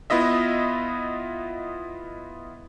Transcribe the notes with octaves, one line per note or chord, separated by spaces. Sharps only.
B3 E4 F4 D#5 E5